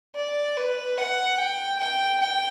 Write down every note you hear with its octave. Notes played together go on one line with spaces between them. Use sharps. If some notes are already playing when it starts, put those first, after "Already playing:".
D5
B4
F#5
G5
G5
G5